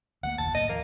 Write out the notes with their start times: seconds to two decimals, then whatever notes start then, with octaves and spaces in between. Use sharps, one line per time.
0.23 D2 F#3 A#3 F#5
0.38 F#1 D#2 A#2 A5
0.54 C2 A2 A#3 D#5
0.69 D#2 F3 A#3